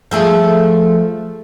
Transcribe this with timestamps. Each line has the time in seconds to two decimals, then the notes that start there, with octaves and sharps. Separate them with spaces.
0.11 F3 A3 G#4